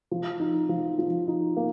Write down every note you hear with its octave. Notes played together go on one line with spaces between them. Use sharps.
F3
D#4
F3
F3
D#4
A#3